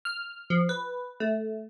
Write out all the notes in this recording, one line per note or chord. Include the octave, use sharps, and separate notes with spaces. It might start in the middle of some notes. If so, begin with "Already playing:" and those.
F6
F3
B4
A3